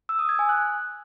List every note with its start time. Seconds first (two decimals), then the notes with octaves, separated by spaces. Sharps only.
0.09 E6
0.19 D#6
0.29 G#6
0.39 G#5
0.49 F#6